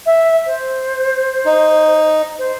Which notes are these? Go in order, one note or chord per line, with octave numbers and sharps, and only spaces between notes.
E5
C5
D#4
C5